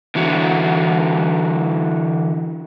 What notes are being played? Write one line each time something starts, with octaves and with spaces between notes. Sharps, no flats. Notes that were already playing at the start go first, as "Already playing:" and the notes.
D3 E3 F#4